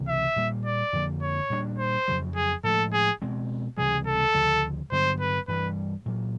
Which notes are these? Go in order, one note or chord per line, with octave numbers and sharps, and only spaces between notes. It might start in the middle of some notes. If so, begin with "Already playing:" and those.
Already playing: C#2 C3 E3 G#3
E5
A#2 G3 A#3
D5
F2 D3 F3 A#3
C#5
A#2 G3 A#3 D4
C5
F2 C#3 F#3
G#4
A2 F3 G#3 A4
G#4
B2 G#3 C4
C#2 C3 E3 G3 G#4
A4
D2 C#3 F3
G2 D3 F#3 B3 C5
B4
G2 E3 G3 B4
A#2 F#3 A#3